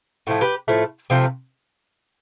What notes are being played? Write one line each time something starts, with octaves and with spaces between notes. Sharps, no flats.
A2 F3 A3
G4 B4
A2 F3 A3
C3 F3 A3